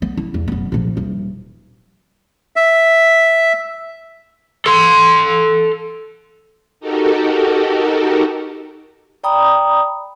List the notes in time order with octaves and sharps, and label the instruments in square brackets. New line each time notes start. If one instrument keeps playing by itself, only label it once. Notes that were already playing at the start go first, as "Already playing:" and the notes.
[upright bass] B3
E4
E2
F#1 B3
A#2 F3
D#1
[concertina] E5
[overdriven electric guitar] A4 C6
[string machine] D#4 F#4 G4 A4 A#4
[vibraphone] D5 G5 A#5 B5 D#6